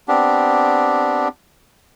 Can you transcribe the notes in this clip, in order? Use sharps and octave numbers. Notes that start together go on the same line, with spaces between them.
B3 C4 D4 G4